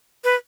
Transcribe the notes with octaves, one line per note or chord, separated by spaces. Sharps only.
B4